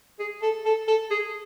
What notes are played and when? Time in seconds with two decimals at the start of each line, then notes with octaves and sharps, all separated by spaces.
0.19 G#4
0.42 A4
0.66 A4
0.88 A4
1.11 G#4